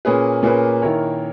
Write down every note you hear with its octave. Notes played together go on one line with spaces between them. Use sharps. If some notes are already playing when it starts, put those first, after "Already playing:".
A#2 A#3 C#4 G#4 B4
A#2 A#3 C#4 G#4 B4
D#3 A#3 E4 A#4 C#5